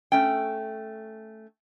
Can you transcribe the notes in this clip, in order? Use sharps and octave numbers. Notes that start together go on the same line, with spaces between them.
A3 C#4 G5